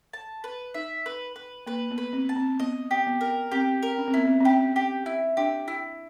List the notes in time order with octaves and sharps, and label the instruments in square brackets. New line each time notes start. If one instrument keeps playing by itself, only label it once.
[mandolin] A5
B4
[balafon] D#4 [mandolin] E5
[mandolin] B4
B4
[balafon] A#3 [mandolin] B4
[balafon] B3
[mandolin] B4
[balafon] C4
[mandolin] A5
[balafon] C4
[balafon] B3 [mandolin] D#5
[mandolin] G4
[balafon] B3
[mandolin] A#4
[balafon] C4 [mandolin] G4
[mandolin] A#4
[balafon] C#4
C4
[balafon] B3 [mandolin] E4
[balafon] C4
C4
[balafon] C#4 [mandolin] G4
[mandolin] G4
E4
[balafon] D4 [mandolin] G4
[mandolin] E4